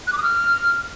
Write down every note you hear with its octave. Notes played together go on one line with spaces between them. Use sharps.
F#6
D6
D#6
F6